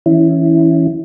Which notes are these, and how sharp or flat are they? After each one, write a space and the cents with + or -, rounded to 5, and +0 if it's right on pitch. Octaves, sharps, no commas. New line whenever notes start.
E3 -10 C#4 +0 E4 +0